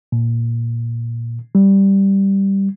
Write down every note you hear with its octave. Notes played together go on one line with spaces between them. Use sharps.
A#2
G3